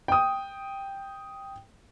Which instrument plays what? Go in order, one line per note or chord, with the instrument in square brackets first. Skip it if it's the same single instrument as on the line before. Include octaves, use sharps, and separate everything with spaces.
[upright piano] G5 D#6